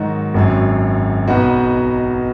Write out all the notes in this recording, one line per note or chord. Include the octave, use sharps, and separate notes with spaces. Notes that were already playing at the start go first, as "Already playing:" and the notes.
Already playing: G#2 D#3 F#3 D#4 F#4
G#1 F#2 F#3
B1 B2 B3 D#4 F#4